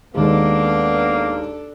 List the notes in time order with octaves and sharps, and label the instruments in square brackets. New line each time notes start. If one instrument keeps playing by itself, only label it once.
[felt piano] D#2 G#3 [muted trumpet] A#3 [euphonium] B3 [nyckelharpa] D4 A4